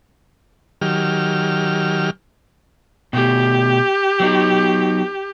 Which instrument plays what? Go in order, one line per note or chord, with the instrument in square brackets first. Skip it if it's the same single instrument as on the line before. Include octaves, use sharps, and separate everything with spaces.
[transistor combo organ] D#3 F#3 G4 F6
[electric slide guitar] B2 A3 [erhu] G4
[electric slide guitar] F#3 B3 D#4